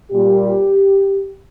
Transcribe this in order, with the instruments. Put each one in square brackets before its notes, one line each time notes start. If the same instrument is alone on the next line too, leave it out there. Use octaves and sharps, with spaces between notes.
[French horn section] A#2 G3 G4